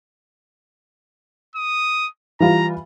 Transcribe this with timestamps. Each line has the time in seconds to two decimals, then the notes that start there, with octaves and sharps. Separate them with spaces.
1.56 D#6
2.40 E3 G3 F4 A#5